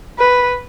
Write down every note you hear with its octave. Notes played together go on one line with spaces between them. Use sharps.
B4